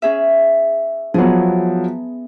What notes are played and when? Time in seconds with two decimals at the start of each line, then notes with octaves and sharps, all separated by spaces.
0.02 C#4 G#4 E5
1.14 F3 F#3 B3 G#4